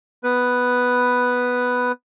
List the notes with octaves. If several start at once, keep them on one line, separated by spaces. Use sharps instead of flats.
B3 B4